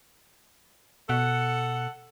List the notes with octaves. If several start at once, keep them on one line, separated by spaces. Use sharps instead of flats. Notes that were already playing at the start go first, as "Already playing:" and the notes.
B2 A4 F#5